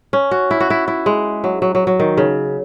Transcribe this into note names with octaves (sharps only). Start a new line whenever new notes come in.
C#4
F#4
E4
F#4
E4
E4
G#3
F#3
F#3
F#3
F#3
D#3
C#3